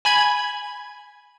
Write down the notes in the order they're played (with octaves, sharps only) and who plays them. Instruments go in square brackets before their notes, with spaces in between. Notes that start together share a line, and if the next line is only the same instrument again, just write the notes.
[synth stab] G#5 B5 G#6